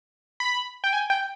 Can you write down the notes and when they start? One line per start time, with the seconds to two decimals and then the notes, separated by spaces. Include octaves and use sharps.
0.40 B5
0.84 G5
0.93 G#5
1.10 G5